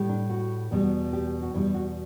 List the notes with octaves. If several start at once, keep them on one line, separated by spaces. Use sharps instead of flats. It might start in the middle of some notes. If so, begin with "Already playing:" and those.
Already playing: A2 G3
D4
F#4
E2 B2 G3
G4
F#4
E2 B2 G3 E4
F#4